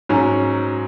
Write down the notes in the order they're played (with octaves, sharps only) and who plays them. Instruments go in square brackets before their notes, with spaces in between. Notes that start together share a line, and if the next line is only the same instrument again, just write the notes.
[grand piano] G#2 F#3 C#4